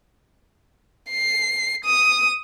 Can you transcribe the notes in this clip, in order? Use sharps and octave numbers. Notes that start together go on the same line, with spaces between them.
C7
D#6